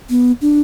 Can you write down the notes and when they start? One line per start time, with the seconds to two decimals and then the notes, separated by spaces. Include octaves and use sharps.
0.10 B3
0.41 D4